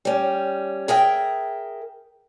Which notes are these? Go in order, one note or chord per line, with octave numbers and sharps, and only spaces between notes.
G3 C#4
G#4 A#4 E5 G5